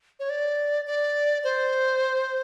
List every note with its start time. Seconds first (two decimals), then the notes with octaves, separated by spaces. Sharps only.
0.19 C#5
0.30 D5
0.87 D5
1.44 C5